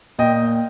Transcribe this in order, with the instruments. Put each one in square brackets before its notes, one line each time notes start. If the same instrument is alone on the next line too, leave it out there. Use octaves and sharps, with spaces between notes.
[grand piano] A#2 D#5 G5